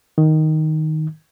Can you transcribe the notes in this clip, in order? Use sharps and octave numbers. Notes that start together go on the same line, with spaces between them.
D#3